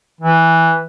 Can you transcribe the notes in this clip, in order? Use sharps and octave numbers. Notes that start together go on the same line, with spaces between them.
E3